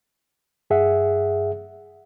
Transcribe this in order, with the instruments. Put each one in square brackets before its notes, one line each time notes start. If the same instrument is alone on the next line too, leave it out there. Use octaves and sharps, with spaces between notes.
[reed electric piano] G2 G#4 E5 F#5